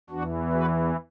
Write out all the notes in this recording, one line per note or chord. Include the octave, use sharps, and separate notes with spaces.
E2 E3 D4 F#4
F#4 B4